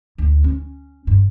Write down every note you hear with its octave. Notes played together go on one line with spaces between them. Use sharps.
D2
C#4
G2